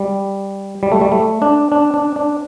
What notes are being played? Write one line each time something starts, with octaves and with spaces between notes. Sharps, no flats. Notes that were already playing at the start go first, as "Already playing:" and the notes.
Already playing: G3
G3
A3
G3
A3
D4
D4
D4
D4